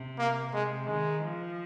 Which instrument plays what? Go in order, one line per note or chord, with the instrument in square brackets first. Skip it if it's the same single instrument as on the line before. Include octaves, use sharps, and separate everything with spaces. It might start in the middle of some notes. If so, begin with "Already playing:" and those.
Already playing: [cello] C3
[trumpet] A#3
[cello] C3 [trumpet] G#3
[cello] D#3 [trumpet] G#3
[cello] F3